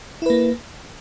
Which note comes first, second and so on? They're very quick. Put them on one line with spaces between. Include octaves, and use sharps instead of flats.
E4 B4 A#3